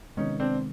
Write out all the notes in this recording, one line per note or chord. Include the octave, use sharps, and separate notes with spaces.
C3 D#3 G#3 B3 C#4 D#4
C4 D4